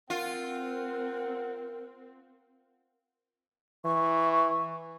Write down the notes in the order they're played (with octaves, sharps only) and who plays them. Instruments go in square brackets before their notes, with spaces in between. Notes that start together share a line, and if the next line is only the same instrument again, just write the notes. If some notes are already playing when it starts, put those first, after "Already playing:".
[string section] C4 [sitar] F4 [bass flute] A#4 [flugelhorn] F#5
[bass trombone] E3 [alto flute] C#6